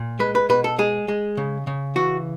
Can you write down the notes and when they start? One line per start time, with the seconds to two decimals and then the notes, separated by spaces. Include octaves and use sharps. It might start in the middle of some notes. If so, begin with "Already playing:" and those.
Already playing: A#2
0.19 G#3 B4
0.35 B4
0.49 B2 B4
0.64 A4
0.79 G#3 G#4
1.08 G#3
1.37 C#3
1.67 C#3
1.96 E3 F#4